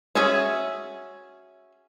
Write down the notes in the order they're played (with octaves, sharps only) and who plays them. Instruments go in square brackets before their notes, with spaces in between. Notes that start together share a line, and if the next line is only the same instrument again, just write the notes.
[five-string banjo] C#4 F#4 G#4 E5 G#5